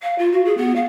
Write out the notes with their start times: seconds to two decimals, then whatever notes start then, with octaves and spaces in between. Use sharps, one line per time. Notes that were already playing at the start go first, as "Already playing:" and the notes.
0.02 F5
0.18 F4
0.32 F#4
0.45 G#4
0.57 B3
0.75 F5